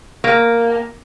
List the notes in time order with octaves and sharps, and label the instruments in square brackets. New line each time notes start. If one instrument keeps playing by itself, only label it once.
[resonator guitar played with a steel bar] A#3